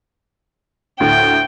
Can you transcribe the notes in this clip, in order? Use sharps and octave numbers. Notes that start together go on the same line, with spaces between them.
D2 A2 G5